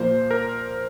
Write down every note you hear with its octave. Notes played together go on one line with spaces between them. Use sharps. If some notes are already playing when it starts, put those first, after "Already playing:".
Already playing: A#2 F3 A#3 C5
A#4